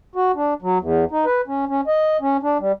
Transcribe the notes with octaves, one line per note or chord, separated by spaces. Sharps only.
F#4
D4
F#3
E2
D#4
B4
C#4
C#4
D#5
C#4
D4
G3